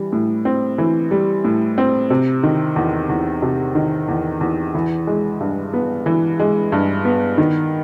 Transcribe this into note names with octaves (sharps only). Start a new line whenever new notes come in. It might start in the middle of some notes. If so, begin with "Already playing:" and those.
Already playing: E3 G3
A2
C4
E3
G3
A2
C4
C3
D#3
E2
E2
C3
D#3
E2
E2
E3
G#3
G2
B3
E3
G#3
G2
B3
D#3